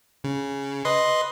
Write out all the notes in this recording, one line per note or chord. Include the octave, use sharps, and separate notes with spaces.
C#3
B4 D#5 C6